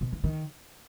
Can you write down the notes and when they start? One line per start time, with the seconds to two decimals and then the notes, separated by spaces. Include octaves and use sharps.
0.01 B2
0.12 E3
0.24 D#3